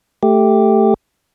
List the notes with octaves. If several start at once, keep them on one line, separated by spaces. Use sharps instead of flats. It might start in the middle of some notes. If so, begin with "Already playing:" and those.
A3 G4